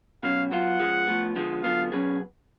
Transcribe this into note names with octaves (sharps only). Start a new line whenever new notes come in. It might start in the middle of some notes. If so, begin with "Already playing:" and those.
B2 F#3 C#4 F5
F#3 B3 F4 F#5
G#2 F3 G#3
A2 F3 B3
D3 F3 G#3 B3
D3 F#3 B3 F4 A4 F5
B2 F#3 C#4 G#4 B4